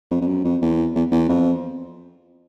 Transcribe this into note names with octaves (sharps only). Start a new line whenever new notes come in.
F2
F2
F#2
F2
E2
E2
E2
F2